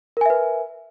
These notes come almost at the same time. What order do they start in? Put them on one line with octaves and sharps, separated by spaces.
A#4 G#5 E5 B4